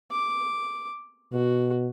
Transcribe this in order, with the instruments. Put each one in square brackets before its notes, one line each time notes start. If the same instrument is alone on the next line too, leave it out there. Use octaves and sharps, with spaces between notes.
[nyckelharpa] D6
[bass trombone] B2 [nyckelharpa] F#4